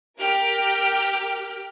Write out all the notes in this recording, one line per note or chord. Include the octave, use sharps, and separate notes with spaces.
G4 A#4 G5 F6